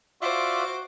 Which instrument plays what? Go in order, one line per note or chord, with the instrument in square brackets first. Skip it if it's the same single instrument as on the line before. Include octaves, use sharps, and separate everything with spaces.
[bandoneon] F4 D5 E5 [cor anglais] F#4 [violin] C5 D6